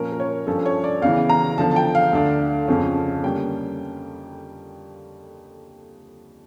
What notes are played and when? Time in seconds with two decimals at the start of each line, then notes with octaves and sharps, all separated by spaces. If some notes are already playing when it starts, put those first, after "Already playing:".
Already playing: A#2 F3 C#4 A#4
0.12 A#4
0.20 C#5
0.46 G2 F3 C#4 A4
0.66 C#5
0.84 D5
1.02 E2 C#3 E3 F5
1.29 A#5
1.57 E2 D3 F3 A5
1.71 A5
1.76 G5
1.95 F5
2.13 D2 D3 A3 D4
2.68 F2 C#3 F3 C#4
3.24 D3 G3 A#3 C#4 G5